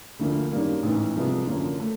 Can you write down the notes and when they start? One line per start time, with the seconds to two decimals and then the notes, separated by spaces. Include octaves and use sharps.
0.19 D2 D3 F3 A#3
0.51 F#2 D#3 G3 A#3 D4
0.83 A1 G#2 E3 G#3
1.15 C2 C3 F3 G#3 B3
1.47 F#2 D3 F3 A#3
1.80 A3